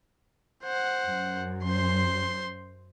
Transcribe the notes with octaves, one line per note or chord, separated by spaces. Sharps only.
C5 F#5
F#2
C5 C6